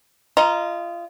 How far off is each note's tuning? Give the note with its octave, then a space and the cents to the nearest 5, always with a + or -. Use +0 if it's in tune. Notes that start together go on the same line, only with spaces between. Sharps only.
F4 -25 D#5 +0 A#5 +0